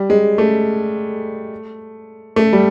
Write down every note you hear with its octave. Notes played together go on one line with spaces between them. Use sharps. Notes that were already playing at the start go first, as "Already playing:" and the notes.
Already playing: G3
G#3
A3
A3
G3